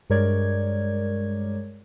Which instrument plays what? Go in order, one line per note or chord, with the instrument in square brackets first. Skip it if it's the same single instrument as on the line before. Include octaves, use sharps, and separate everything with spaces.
[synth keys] G2 G#3 A#4 C#5 D5 G#6